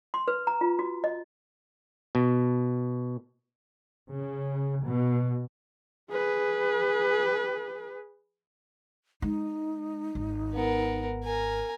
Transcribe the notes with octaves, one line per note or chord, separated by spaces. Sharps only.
C6
B4
A#5
F4
F#4
D#5
B2
C#3
B2
G#4 B4
G#3 D#4
G#1
B3 A#4
A#4 G#5 A#5